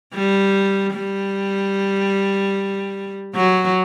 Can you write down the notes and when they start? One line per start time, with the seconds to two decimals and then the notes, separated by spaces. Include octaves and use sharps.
0.15 G3
0.94 G3
3.35 F#3